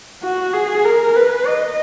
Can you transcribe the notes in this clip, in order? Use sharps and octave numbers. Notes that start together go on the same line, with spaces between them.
F#4
G#4
A#4
B4
D#5